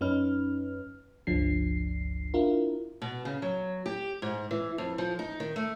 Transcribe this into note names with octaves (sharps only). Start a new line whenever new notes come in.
F#2 C#4 D#4 B4 F6
G1 C#2 F3 D4 C7
D4 E4 F4 A#4
B2
C#3
F#3
G4
G#2
E3
F2
F3
D#4
D#3
A3